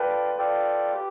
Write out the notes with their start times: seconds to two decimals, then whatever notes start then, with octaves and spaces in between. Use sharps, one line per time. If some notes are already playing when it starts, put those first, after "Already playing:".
Already playing: F4 A4 B4 D5 G5
0.39 F4 A4 D5 G5
0.94 G4